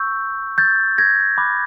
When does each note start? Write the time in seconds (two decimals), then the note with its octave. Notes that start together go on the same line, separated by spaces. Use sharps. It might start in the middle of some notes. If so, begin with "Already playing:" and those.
Already playing: C#6 E6 G6
0.58 G6 A6
0.98 G#6 A#6
1.38 B5 D6 F#6